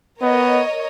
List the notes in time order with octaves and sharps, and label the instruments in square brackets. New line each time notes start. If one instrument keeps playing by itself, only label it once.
[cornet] B3 [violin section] A#4 C#5 D#5